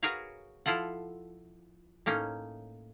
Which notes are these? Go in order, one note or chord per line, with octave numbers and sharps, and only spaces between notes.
F#4 G#4 A#4 B4 C#5 F5
F3 E4 F4 A4 F#5
A2 A#3 C#4 D#4